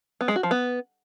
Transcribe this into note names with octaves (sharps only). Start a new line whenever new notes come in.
B3
G#3
F#4
F3
B3